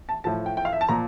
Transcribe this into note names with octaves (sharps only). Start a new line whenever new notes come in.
A5
A2 F3 A5
G5
G5
F5
E5
A5
A#2 F3 A#5